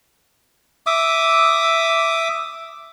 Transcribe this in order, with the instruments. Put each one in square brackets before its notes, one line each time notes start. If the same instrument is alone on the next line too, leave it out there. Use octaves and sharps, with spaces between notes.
[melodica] E5 D6 D#6